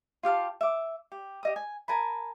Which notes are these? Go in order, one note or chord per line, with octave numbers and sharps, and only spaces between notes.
F4 G4 F5 A5
E5 D6
G4
G4 D#5 D#6
G#5
A#4 G#5 A5 B5